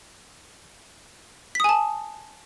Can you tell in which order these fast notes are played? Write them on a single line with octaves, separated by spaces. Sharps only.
B6 D#6 G#5 A5